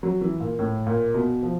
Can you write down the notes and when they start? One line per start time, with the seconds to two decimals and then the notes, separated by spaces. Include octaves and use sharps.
0.03 F#3
0.21 E3
0.40 A#2
0.59 A2
0.87 A#2
1.14 B2
1.43 F3